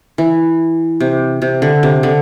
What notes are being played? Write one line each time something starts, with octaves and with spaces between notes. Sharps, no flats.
E3
C3
C3
D3
C3
D3